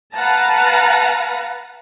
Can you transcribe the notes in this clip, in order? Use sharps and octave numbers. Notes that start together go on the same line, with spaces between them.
B4 F5 F#5 A5 A#5